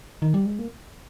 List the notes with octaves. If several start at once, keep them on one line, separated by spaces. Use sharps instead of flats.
D#3
G3
G#3
A#3